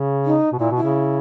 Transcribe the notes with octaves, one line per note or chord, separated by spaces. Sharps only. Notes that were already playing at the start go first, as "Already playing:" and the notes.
Already playing: C#3
D#4
B2
A#2 E4
B2
E4
C#3